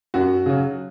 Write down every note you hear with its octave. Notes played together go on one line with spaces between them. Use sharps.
F#2 F#4
C#3 F#3